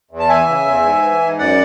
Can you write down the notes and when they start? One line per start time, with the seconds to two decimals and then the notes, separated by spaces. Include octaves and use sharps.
0.11 E2
0.19 A5
0.29 E3 E5 G#5
0.48 C#3
0.65 E2
0.83 G#2
1.02 E3
1.21 G#2
1.39 F#2 D5 F#5